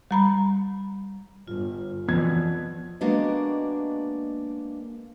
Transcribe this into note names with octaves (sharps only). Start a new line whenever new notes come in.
G3 A#5 B5
G1 F4
F2 B2 E3 B3 G#6
G#3 A#3 B3 D4 F#4 D#5